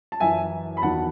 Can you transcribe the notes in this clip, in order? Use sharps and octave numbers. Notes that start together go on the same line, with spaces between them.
A5
F#2 E3 E5 G#5
B5
E2 D#3 F#3 F#5 A5